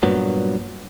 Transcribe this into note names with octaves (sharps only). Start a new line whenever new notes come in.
G2 A#2 F#3 B3